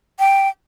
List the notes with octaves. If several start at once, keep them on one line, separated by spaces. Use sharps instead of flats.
G5